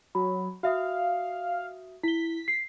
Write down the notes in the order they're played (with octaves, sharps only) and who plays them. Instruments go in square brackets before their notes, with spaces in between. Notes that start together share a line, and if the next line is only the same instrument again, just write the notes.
[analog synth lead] F#3 [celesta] B5
[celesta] F#4 E5 D#6 [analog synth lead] F5
[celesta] E4 G7 [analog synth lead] B6
[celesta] C7